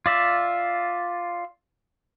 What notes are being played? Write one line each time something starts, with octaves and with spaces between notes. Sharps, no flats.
F4 D5 E5